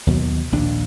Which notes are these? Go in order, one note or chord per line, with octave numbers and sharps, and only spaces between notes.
D#2 B2 F#3
A#1 D#2 D4